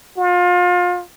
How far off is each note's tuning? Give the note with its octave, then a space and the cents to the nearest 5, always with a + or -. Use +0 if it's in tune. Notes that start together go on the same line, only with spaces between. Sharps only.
F4 +30